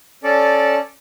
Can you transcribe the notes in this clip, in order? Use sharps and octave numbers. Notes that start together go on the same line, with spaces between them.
C#4 A4 D5